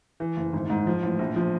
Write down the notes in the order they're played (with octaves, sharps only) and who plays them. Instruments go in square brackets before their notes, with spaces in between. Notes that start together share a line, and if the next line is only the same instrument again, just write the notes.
[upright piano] E3
F#1
G#1
G#2
F3
A1
A#1
F3